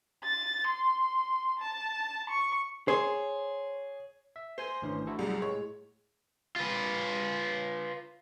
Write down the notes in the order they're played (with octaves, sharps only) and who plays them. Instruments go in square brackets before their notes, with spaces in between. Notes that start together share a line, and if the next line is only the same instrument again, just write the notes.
[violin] A6
C6
A5
C#6
[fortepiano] G#4 [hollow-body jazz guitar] C5 [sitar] C#5
[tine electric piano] E5
[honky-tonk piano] C5 [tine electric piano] G#5 C6
[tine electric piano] G#1 E3 C#4 [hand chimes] A3 D4
[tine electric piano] E4 F#4 A4
[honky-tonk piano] C2 F#2 [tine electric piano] G3 [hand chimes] G#4
[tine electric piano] A2 G#3 [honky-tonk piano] C#5
[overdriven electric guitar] F4 B4